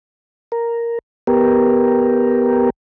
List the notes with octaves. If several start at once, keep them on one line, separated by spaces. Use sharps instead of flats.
A#4
B3 G4 A#4